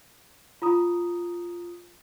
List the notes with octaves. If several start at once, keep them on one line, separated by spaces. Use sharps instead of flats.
F4 A#5 D#6